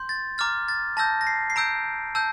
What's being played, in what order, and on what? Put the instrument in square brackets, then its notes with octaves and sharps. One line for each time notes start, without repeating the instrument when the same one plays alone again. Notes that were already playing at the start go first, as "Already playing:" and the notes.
Already playing: [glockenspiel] C6 G6
A6
A#5 D6 F6 A6
A6
A5 E6 G6 A#6
A#6
C7
C7
A#5 E6 G6 D7
A5 E6 G6